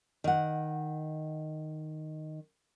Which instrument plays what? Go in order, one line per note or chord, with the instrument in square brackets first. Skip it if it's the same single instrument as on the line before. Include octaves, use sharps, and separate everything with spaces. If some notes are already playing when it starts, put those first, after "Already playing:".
[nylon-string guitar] D#3 F#5